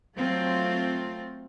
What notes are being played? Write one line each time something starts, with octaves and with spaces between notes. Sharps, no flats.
F#3 A3 C4 F4